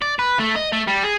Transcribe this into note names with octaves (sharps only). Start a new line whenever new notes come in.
D5
B4
A3
D#5
A3
G3
G#4